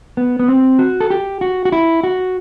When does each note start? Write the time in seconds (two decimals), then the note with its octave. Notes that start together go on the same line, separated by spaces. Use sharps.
0.17 B3
0.39 B3
0.48 C4
0.79 F#4
1.00 A4
1.10 G4
1.41 F#4
1.65 F#4
1.72 E4
2.03 F#4